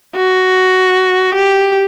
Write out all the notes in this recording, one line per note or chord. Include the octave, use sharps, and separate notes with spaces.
F#4
G4